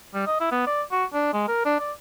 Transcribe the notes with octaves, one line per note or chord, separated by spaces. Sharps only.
G3
D#5
E4
B3
D5
F#4
D4
G#3
A#4
D4
D5